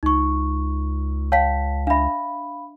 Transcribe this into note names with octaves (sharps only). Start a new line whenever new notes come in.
C#2 D#4 C#6
C#5 F5 G5 A5 B6
D4 E5 F5 B5